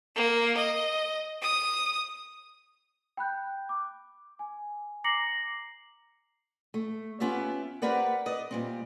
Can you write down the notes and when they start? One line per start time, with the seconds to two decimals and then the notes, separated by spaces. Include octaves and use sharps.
0.15 A#3
0.57 D#5
1.42 D#6
3.17 G5 B5 F#6 G6
3.69 D6
4.39 G#5
5.04 A#5 D6 A#6 C7 C#7 F#7
6.74 A3
7.20 B3 C#4 F4 G4 E5
7.82 C4 G4 A#4 B4 D5 F#5
8.26 B4 D5 D#5
8.51 A#2 G3 C4